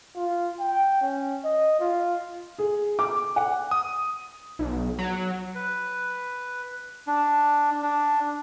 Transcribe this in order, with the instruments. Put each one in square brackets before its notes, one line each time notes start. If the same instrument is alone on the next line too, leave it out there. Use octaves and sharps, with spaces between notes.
[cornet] F4
G5
C#4
D#5
F4
[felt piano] G#4
D6
F#5
[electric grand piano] D#6
[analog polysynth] B1
F#3
[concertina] B4
D4
D4